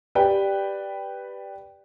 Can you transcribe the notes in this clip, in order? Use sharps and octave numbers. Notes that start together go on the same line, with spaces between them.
G4 B4 D5 G5